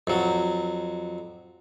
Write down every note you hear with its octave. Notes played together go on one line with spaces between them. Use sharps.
F2 F#3